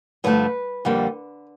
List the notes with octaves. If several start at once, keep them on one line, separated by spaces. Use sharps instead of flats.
G2 D3 F3 A3 B4
F2 D3 G3 A#3